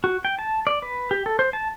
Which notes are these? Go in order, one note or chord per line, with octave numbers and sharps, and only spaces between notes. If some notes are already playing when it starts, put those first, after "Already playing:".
F#4
G5
A5
D5
B4
G4
A4
C5
A5